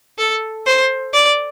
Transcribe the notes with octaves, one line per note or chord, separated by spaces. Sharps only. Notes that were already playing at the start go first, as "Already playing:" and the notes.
A4
C5
D5